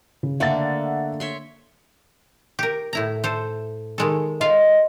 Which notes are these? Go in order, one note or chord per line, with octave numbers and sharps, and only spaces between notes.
C#3
D3 A3 A#3 E5 F#5 A6
C#5 E5 C6
G4 A#4
A2 E4 A#5
A4 C5
D#3 G#3 A4
F4 D#5 F5